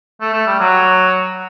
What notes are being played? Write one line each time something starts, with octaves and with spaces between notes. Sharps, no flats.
A3
A3
G3
F#3